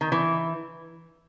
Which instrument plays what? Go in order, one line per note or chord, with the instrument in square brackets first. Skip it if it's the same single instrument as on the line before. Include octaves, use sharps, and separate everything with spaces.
[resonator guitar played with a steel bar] D#3
E3